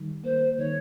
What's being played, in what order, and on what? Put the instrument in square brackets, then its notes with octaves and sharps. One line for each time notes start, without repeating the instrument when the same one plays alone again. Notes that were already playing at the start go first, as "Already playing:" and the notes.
Already playing: [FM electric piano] D#3 G3
[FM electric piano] A#3 [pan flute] C5
[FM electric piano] D#3 [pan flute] C#5